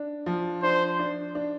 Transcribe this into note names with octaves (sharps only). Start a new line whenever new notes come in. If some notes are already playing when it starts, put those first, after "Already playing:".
Already playing: D4
F3
D4 C5
D4
D4